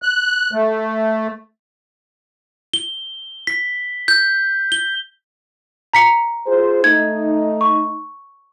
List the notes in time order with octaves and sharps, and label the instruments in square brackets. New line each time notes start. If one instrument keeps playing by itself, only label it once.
[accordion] F#6
A3
[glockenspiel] G7
B6
G6
G7
[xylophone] A#5 B6 C#7
[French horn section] F4 G#4 C5
[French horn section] A3 D#4 [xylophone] G#6
[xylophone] C#6